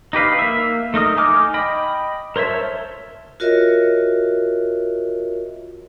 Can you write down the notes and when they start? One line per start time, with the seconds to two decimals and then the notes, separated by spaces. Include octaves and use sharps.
0.13 D#4 G4 B4 F5
0.39 A#3 E5
0.94 A3 D#4 A#4 D#6
1.17 D#4 G#5 D6 F6
1.54 D#5 G5 B5
2.36 A#4 C5 C#5 E5 A5
3.40 F4 F#4 A#4 C#5 D#5 E5